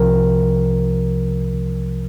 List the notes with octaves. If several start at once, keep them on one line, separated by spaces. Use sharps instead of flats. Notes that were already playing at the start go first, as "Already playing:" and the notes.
Already playing: C2 C3 F3 A#4